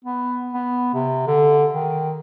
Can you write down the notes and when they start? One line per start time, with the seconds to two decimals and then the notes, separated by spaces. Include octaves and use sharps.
0.04 B3
0.53 B3
0.94 C3
1.27 D3
1.73 D#3